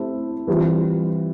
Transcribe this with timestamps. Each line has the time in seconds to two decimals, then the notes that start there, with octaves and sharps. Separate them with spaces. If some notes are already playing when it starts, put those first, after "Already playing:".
Already playing: A3 C4 E4 G4 C5
0.47 E3 G3 C4 F4